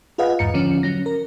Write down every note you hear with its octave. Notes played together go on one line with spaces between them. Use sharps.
F4 G#4 B4 D#5 F5 F#5
E2 G#2 A#5 C#7
D3 F3 C#4
F#3 C#4 A#6
A#4